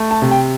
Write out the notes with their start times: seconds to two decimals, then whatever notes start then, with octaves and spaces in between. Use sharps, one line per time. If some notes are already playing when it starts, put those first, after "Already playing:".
Already playing: A3
0.11 A5
0.22 C3
0.31 G5